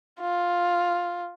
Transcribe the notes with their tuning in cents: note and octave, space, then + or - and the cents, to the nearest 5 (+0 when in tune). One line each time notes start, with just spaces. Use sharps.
F4 +5